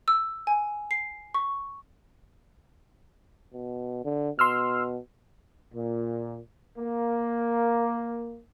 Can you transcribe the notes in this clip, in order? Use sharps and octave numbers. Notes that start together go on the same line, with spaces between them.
E6
G#5
C7
C#6
B2
D3
B2 C6 E6 F6
A#2
A#3